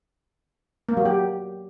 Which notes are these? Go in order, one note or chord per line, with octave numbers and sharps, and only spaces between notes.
A#3
F#3
G4